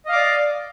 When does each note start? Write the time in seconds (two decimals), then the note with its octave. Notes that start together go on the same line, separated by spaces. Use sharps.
0.06 D#5
0.09 F5
0.12 D6
0.16 D5